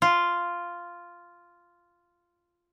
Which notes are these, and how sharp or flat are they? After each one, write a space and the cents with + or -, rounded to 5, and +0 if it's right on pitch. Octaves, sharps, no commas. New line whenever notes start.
F4 -5